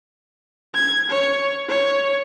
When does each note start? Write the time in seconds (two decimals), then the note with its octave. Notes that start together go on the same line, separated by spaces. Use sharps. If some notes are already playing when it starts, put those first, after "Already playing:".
0.74 G#6
1.10 C#5
1.69 C#5